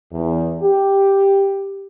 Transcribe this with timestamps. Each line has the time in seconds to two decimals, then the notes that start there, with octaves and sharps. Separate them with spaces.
0.12 E2
0.61 G4